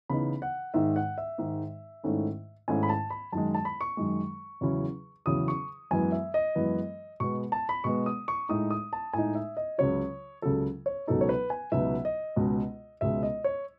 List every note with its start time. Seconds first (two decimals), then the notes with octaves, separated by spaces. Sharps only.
0.09 C#3 E3 B3 D#4 B5
0.42 F#5
0.74 G#2 D#3 G#3 D#4 E5
0.96 F#5
1.18 E5
1.38 G#2 D#3 G#3 D#4
2.04 G#2 D#3 A3 C#4 E4
2.68 G#2 D#3 A3 C#4 E4 G#5
2.83 B5
2.89 A5
3.10 B5
3.32 F#2 D#3 G#3 A5
3.54 A5
3.65 B5
3.81 C#6
3.97 F#2 D#3 G#3
4.61 E2 C#3 F#3 C#4 E4
5.26 E2 C#3 F#3 C#4 E4 D#6
5.48 C#6
5.91 F#2 E3 G#3 B3 G#5
6.12 E5
6.34 D#5
6.55 F#2 E3 G#3 B3
7.20 B2 G#3 B3 C#6
7.52 A5
7.69 B5
7.84 B2 G#3 B3 C#6
8.06 D#6
8.28 C#6
8.49 A2 G#3 D#4 D#6
8.71 D#6
8.93 A5
9.14 A2 G#3 D#4 G#5
9.35 E5
9.57 D#5
9.78 C#2 C#3 F#3 C#5
10.42 C#2 C#3 F#3 A4
10.86 C#5
11.07 C#2 B2 F#3 B3 D#4 A4
11.21 C#5
11.29 B4
11.50 G#5
11.71 C#2 B2 F#3 B3 D#4 E5
12.05 D#5
12.36 C#2 B2 G#3
13.01 C#2 B2 G#3 E5
13.23 D#5
13.44 C#5